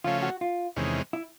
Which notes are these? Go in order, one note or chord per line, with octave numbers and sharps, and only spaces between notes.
C#3 F3 A3 C#4 F4
F#4
F4
E2 C3 D#3 G#3 C#4
E4